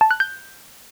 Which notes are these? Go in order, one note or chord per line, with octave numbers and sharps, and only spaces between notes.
A5
F#6
G6